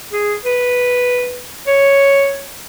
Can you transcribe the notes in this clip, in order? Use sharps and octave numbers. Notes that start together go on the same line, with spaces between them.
G#4
B4
C#5